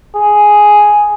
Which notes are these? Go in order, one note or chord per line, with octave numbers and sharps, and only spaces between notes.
G#4